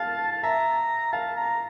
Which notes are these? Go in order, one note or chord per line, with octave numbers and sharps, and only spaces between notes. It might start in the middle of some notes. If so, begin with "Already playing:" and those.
Already playing: F5 A5
A5
E5 A#5
F5 A5
A#5